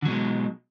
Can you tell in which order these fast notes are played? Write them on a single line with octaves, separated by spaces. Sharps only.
D3 F#3 B2 G#3